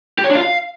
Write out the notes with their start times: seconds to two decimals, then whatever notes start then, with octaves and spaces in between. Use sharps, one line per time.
0.19 G4
0.24 C#5
0.30 D4
0.35 F4
0.41 F5